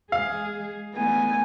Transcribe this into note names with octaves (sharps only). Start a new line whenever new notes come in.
G#3 G#4 F5
A3 B3 G#5